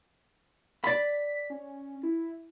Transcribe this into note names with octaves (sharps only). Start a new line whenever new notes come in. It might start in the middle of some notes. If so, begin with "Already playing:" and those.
D5 B5 B6
C#4
E4